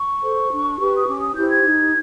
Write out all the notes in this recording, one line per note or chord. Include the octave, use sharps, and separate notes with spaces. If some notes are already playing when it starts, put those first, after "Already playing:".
Already playing: C#6
A4 C5
D4
G4 B4
D#6
C#4 D6
D#6
E4 G4 C5 G6
G#6
D#4